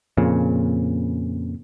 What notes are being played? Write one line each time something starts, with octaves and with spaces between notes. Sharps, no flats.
F2 A#2 C#3